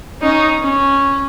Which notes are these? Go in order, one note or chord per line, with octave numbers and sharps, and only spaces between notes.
C#4 D#4
C#4